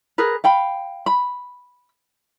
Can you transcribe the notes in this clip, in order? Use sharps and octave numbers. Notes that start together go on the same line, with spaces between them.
G#4 A#4 B4
F5 G5 B5
B5